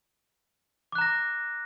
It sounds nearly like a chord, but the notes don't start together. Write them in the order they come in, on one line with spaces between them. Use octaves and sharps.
D6 F#6 A#5 A#6